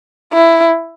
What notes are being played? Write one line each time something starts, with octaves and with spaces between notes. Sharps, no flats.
E4